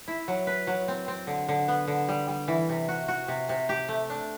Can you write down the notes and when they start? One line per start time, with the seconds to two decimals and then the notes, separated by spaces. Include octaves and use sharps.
0.08 E4
0.28 F#3
0.47 B4
0.67 F#3
0.88 C4
1.08 C4
1.27 D3
1.49 D3
1.68 B3
1.88 D3
2.09 G3
2.28 G3
2.48 E3
2.69 C3
2.88 F#4
3.08 F#4
3.28 C3
3.49 C3
3.69 G4
3.89 A3
4.10 D4